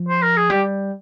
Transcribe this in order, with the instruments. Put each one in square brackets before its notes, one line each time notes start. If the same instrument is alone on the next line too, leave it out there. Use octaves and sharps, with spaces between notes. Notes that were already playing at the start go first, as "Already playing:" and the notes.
Already playing: [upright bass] F3
[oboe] C5
A#4
G#4
[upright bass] G3 [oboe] G4